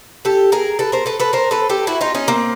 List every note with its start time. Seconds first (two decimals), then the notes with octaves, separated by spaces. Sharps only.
0.25 G4 A4
0.52 G#4 A#4
0.79 A4 B4
0.92 A#4 C5
1.06 A4 B4
1.19 A4 B4
1.33 A#4 C5
1.51 A4 B4
1.70 G4 A4
1.87 E4 F#4
2.01 D#4 F4
2.15 C#4 D#4
2.28 A#3 C4